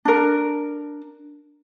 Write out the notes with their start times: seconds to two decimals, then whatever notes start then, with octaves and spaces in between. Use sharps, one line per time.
0.05 D4 A#4